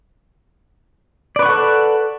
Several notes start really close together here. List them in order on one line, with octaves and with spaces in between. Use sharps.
D5 B4 C#6 F#5 A4